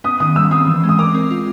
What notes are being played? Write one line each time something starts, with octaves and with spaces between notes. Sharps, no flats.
B3 D#6
D#3 D#6
G3 E6
C4 D#6
E3
G#3
D#6
A#4 D6
C4
F4